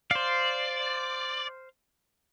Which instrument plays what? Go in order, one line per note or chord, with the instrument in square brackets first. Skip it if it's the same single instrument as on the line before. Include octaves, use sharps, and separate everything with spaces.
[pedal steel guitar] C5 F5 [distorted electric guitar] D5